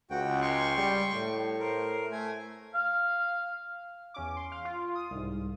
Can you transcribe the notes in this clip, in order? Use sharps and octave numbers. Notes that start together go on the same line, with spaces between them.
C#2 F#4 G5
G5 C6 C#6
G3
A2
A#4 C5
A3 G#5
F5
E2 C#4 D6
C6
F5
F4
D#6
C2 G#2